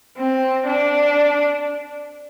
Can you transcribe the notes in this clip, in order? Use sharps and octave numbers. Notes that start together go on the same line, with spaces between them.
C4
D4